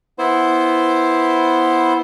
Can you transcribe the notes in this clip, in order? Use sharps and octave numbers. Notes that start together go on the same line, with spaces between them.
B3 E4 C5